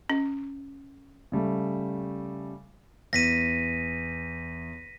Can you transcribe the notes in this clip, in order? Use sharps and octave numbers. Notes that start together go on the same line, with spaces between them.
C#4
C#3 G3 A3
E2 A#6 B6 D#7